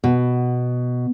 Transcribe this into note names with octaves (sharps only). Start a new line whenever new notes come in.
B2